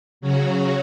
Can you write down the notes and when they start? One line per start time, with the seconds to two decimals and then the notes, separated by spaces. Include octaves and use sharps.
0.21 C#3 F#3 C#4 F#4